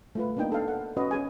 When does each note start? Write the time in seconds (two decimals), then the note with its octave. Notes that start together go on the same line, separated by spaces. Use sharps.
0.15 A3 F4 B4
0.37 A#3 B3 D4 D#4 G5
0.52 A4 F5
0.68 F#5
0.97 C#4 F#4 B4 D#5
1.11 C#4 G#4 G#5